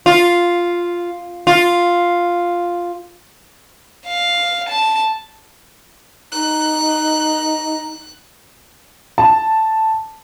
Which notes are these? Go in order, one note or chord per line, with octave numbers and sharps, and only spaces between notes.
F4
F4
F5
A5
D#4 A#5 F#6
A5